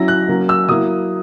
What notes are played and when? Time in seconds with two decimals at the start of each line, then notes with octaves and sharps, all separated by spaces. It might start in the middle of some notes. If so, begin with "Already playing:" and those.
Already playing: F#3 C#4 E4 A#6
0.08 F#6
0.28 F#3 A#3 C#4
0.49 E6
0.69 F#3 A#3 E4 D#6